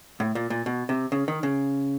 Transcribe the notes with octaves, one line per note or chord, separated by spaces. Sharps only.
A2
A#2
A#2
B2
C3
C#3
D#3
C#3